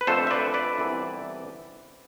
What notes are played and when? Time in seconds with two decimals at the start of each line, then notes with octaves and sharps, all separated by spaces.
0.01 B4
0.07 F2 D3 A3 A4 C5
0.27 E5
0.31 B4 D5
0.54 B4 D5
0.78 C2 C3 E3 B3 E4